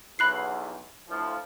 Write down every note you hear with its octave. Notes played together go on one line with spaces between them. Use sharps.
B1 E2 B5 F#6 C7
D2 A2 F3